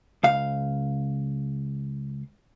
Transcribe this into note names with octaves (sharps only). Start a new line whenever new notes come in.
C#2 F5